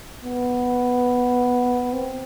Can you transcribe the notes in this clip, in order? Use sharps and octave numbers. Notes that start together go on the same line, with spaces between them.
B3
C4